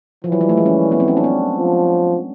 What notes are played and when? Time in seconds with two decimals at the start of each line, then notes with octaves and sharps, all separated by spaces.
0.24 E3 F3
0.32 F#3
0.41 G3
0.49 A3
0.57 G#3
0.66 C#4
0.91 B3
1.00 C4
1.08 C#4
1.17 D4
1.24 C4
1.58 F3